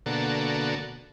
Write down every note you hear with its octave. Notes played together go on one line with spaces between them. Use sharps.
B2 D3 A#3 F#4 A4